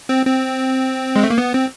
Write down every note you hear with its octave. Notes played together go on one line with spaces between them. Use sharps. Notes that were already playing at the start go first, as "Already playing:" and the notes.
C4
C4
G#3
A3
A#3
B3
C4